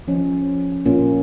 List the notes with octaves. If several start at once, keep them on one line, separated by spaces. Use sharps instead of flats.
F3 C#4
A#2 A#3 C#4 F4